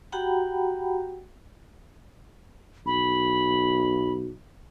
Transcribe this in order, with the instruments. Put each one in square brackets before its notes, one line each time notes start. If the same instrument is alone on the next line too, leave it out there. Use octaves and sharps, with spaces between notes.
[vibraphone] F#4 G4 F#5 G5 A#5 B5
[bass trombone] B1 [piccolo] B5